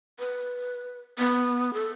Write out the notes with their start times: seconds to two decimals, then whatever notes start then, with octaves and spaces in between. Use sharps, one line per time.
0.20 B4
1.19 B3
1.74 A4